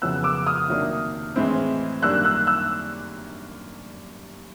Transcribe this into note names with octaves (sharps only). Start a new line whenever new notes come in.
F2 C#3 F#3 B3 E4 E6 F#6
D6 E6
D#6 F6
C3 D#3 F#3 A#3 D4
A2 E3 G#3 C4 E4
F#2 D#3 G3 A#3 D4 E6 F#6
E6 F#6
E6 F#6